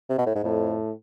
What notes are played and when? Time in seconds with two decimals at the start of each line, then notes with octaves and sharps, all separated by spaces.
0.09 C3
0.18 B2
0.26 A2
0.35 G#2
0.43 F2 A2